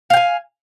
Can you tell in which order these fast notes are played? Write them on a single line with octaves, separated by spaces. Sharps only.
F5 G5 G#5